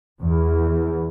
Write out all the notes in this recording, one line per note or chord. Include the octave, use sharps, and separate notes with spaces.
E2